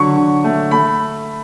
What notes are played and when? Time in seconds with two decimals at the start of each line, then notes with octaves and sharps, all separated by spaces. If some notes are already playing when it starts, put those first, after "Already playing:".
Already playing: D3 F#3 C#6
0.16 D3
0.44 A3
0.71 A3 B5